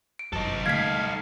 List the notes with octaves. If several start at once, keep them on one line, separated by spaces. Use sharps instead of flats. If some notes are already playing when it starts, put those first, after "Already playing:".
D7
G1 F#2 D#4 A4
D3 G3 A3 F5 G#6 B6